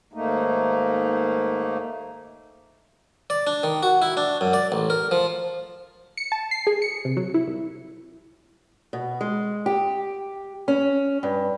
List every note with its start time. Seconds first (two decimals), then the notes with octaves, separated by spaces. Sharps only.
0.13 D#2 G#2 A3 A#3 D#4
3.30 D5
3.47 D4
3.63 D#3
3.83 F#4
4.02 E4
4.17 D4
4.41 F#2
4.53 D5
4.72 A1
4.90 A#4
5.11 F3
6.17 C#7
6.32 A5
6.51 C7
6.67 G#4
6.82 C#7
7.05 C3
7.17 F#3
7.34 E4
7.47 C2
8.93 B2
9.21 G#3
9.66 G4
10.68 C#4
11.23 G2